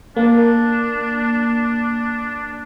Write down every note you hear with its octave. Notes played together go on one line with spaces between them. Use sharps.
A#3 D4